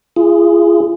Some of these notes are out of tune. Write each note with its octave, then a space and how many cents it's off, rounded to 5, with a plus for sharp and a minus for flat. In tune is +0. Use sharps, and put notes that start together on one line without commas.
F4 -40 G#4 -5